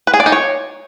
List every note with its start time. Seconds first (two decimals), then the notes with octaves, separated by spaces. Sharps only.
0.07 B4
0.14 G#4
0.20 D5
0.26 D#4
0.32 C#5